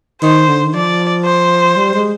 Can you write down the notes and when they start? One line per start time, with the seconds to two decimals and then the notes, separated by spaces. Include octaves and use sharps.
0.22 D#3 C5
0.48 D3
0.64 D#3
0.74 F3 D5
1.25 C5
1.76 G3
1.94 G#3